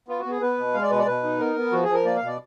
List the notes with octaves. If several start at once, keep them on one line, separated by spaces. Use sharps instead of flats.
B3 F4
F#4
B3 G#4
B3 B4
B2
G#3 F5
D5
B2 B4
D5
B2 B4
D#4
B3 A#4
B3
F3 F#4
G#4
F3
A#4
A#3 D5
F5
B2 D5